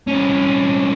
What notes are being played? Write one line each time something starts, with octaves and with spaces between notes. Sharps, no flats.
C2 C#4